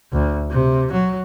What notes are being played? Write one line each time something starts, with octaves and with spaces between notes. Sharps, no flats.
D2
C3
F#3